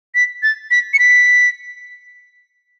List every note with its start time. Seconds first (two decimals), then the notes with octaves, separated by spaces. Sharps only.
0.15 B6
0.43 A6
0.71 B6
0.94 C#7
0.99 B6